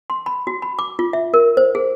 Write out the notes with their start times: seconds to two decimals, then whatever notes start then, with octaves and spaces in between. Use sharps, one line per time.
0.10 C6
0.26 B5
0.47 F#4
0.62 B5
0.79 D6
0.99 F4
1.13 E5
1.34 A#4
1.57 C5
1.75 G#4